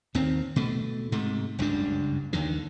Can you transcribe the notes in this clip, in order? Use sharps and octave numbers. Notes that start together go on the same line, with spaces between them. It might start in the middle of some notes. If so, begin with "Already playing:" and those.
D#2 D#3 C4
B2 A3
G#2 C3 A3
F#1 C#2 G2 D4
D#2 D3 D#3